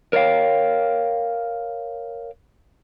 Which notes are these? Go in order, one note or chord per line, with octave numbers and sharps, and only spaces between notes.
A#4 C#5 D5 F5 G5